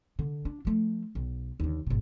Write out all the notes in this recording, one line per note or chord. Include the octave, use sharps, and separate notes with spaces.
D3
D4
F3 A3
B1
D#2 D3
G#1 B2